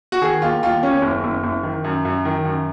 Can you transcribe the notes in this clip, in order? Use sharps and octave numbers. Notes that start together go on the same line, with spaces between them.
F#4
D#3 G#4
D#2 F4
D#2 F4
D#2 C#4
F#1
F#1
F#1
D#3
F#2
F#2
D#3
F#2